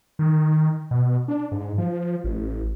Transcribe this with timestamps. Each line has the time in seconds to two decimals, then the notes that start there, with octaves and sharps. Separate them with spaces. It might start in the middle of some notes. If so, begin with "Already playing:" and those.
0.19 D#3
0.91 B2
1.28 D4
1.52 G#2
1.78 F3
2.24 A1